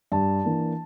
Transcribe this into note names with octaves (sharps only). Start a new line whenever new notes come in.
G2 A5
E3 A#3 D4